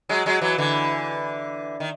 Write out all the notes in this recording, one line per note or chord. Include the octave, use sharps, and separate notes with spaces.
F#3 G#3
F#3 G#3
E3 F#3
D3 E3
D#3